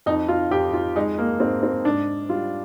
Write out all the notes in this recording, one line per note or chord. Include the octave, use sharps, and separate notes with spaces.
F2 D#4
F4
F2 G4
F4
G#3 D#4
A#3
G#2 C4
C4
G#2 D4
G3 F4